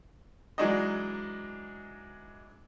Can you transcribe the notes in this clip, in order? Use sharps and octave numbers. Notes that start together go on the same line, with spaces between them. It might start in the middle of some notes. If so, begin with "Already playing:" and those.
E3 F#3 G#3 D4 D#4 D#5